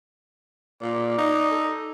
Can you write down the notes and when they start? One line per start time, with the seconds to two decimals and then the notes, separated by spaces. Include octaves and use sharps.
0.82 A#2 D5
1.18 D#4
1.51 A4